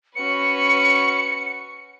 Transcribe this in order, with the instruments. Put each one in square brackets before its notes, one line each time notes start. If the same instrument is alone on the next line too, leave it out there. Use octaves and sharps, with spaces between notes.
[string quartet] C#4 F#4 B4 [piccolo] C#7